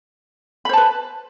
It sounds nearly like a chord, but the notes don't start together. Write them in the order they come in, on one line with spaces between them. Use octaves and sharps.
B5 C5 A5 B4